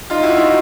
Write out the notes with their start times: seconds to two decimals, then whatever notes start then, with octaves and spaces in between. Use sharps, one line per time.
0.10 D#4 F4
0.23 E4 F#4
0.36 D#4 F4